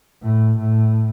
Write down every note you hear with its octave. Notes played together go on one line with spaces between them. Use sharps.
A2
A2